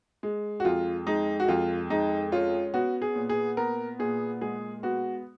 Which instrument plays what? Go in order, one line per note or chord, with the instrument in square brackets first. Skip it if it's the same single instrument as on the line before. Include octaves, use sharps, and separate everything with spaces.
[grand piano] G#3
F#4
F2 F4
G#3 D#4
F#4
F2 F4
G#3 D#4
C#4 F4
B3 F#4
G#4
A#2
G#4
B3 A#4
A#2 G#4
G#3 G#4
B3 F#4